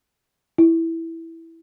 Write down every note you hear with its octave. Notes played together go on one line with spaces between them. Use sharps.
E4